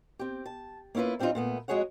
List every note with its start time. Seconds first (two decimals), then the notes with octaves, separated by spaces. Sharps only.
0.19 C4 G4
0.46 A5
0.95 A#3 C#4 E4 F4 B4
1.19 G3 C4 D4 D#4 F4
1.35 A#2 A3 B3
1.68 F2 G#3 F#4 G#4 C#5 F#5